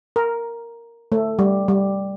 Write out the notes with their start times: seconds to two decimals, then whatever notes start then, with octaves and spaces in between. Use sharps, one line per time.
0.16 A#4
1.12 A3
1.39 G3
1.68 G3